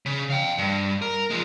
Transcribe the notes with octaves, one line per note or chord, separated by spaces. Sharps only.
C#3
F5 G5
G2
A#4
F3 G#3